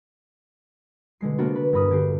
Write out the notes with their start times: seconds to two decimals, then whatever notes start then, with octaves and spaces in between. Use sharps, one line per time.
1.21 B2 D3 G#3 C7
1.38 C3 A#3 B3 D4 F#4
1.55 B4
1.72 E1 G2 G3 A#4 B5 D#6
1.91 D3 G4 C7